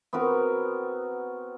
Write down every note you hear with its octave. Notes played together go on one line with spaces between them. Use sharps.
B3 C4 F#4 A#4